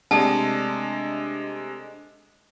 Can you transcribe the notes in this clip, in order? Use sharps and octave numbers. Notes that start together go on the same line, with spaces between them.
C3 G#3 A3 D4 D#5 A5